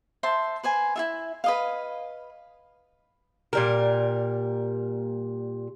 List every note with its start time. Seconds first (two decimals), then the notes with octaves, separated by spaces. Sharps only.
0.23 C5 E5 A5 C6
0.63 B4 C5 G#5
0.96 E4 F4 E5
1.44 B4 D#5 F5
3.53 A#2 G3 A#4